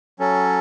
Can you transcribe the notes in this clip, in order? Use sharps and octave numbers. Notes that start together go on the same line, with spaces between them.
F#3 C#4 A4